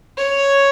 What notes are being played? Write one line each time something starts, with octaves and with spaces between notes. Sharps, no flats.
C#5